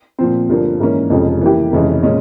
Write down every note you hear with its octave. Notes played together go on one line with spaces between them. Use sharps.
A#2 F3 C4
G1 G2 F3 A#3
G#2 E3 A#3 C#4
F1 F2 C#3 F3 G#3
E3 A#3 E4 G4
F1 F2 C#3 E3 G#3
A#2 G#3 C#4